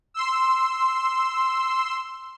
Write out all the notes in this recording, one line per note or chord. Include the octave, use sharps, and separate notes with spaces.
C6 E6